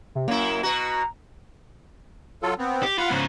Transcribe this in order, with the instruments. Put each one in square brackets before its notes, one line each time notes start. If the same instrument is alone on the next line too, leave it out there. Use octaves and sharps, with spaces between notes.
[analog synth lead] C3
[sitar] F#2 E4 [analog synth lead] A#3
[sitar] B2 F#4 [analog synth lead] A#5
[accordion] F#3 F4 A4
B3 C4
[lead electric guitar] G4
[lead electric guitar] F4 [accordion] F#5 B5
[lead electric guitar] G#2 C#3